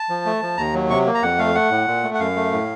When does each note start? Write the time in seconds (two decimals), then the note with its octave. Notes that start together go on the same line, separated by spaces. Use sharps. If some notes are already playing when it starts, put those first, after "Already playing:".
Already playing: A5
0.09 F3
0.26 A3
0.42 F3
0.57 D#2 A#5
0.74 F#3
0.90 C3 C#6
1.06 A#3
1.15 A#5
1.23 F2 F#5
1.39 A3 F5
1.55 A3 F#5
1.71 A2
1.87 A#2
2.04 A3
2.14 F#5
2.20 F#2 F5
2.36 A3
2.52 A2